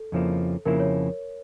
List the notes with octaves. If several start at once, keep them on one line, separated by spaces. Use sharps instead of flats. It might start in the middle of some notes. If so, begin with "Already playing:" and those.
Already playing: A4
F2 C#3 F3 A#3 E4
F2 C#3 F3 A#3 E4 A#4
C#5